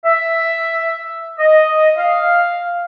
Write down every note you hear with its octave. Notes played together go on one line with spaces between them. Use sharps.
E5
D#5
F5